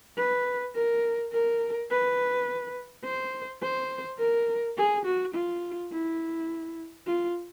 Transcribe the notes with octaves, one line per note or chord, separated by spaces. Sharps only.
B4
A#4
A#4
B4
C5
C5
A#4
G#4
F#4
F4
E4
F4